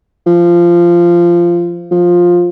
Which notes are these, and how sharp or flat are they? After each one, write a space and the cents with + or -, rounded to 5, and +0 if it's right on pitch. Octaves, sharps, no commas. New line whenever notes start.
F3 -15
F3 +10